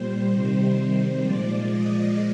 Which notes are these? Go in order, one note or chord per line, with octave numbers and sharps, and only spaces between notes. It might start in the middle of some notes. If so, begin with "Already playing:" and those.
Already playing: A#2 G3 C5
C3 D#3 G3
A#2 F3 G#3 D5
D#5